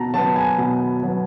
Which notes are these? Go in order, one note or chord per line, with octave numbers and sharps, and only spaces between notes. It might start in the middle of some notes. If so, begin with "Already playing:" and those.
Already playing: B2 A5 A#5
F#3 B3 A5
G#5
B2
F#3 B3